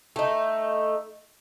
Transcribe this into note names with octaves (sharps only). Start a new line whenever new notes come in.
A3 D#4